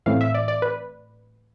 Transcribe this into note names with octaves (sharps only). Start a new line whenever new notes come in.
A2 E3 A3 C4 F5
E5
D5
D5
B4